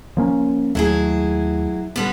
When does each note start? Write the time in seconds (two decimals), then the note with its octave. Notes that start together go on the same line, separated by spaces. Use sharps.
0.17 F3 A#3 C#4
0.75 D#2 F#3 A3 E4 G#4
1.96 D3 G3 B3